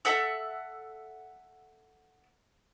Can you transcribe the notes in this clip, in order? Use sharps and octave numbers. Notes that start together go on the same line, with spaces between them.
A4 E5 F#5 E6